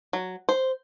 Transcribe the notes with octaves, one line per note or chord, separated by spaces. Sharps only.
F#3
C5